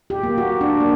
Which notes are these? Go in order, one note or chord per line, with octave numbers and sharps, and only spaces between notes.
G4
A#3
F#4
D4
A#3